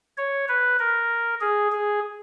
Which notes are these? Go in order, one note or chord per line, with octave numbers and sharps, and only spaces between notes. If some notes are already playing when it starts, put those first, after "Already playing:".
C#5
B4
A#4
G#4
G#4